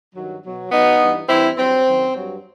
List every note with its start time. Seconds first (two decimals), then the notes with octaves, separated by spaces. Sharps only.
0.15 G2 D#3 F#3
0.43 B2 F#3
0.71 B2 F#3 B3 D#4
0.99 G2 E3
1.28 G2 E3 C4 E4
1.57 G2 F#3 C4
1.85 F#2 D#3 F#3
2.14 G2 F#3